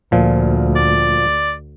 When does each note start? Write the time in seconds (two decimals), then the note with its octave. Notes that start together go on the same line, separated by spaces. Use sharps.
0.12 D2 A#2 F3
0.76 D5